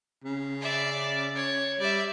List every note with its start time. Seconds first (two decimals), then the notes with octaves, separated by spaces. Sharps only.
0.24 C#3
0.61 D5 E5
1.35 C#5
1.80 G3 D5 E5